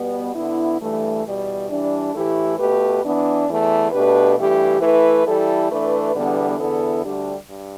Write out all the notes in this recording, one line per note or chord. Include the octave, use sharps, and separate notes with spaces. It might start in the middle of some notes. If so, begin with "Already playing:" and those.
Already playing: B2 G3 B3
D3 B3 E4
G2 E3 A3
E2 B2 G3
E3 G3 D4
A2 E3 A3 E4 G4
B2 A3 G4 B4
E3 B3 D4
E2 E3 A3
B2 A3 D4 G4 B4
G2 E3 A3 G4
E3 A3 E4 B4
E3 G3 E4 A4
E3 A3 D4 B4
E2 D3 G3 B3 D4
E2 D3 B3 E4 A4
D2 D3 G3 D4 G4
G2